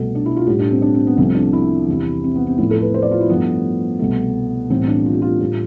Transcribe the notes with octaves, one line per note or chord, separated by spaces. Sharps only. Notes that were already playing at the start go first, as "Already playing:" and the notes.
Already playing: C2 B2 A3 A4
D4
E4
F4
A2 G3 G4
D4
C4
D4
C4
B3
C2 C3 F3 A3 C4
D4
E4
E2 C3 G3
C4
B3
C4
A2 F3 A3 E4
A4
B4
C5
D5
F4
E4
G2 F3 A3 B3
C2 B2 A3
A2 E3 G3 C4
D4
F4
G4
F4
A2 G3